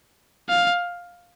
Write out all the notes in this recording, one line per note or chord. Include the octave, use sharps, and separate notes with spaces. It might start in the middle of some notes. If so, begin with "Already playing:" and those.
F5